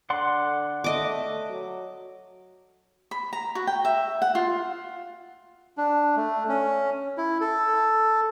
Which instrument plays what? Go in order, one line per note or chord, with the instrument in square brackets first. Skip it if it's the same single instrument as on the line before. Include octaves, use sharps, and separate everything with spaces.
[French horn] D3 [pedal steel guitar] D5 F#5 C6
[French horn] A3 [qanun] D#5 D6
[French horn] F#3
[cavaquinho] B5
A#5
F#4
G5
E5
F#5
F4
[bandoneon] D4
A3
C#4
E4
A4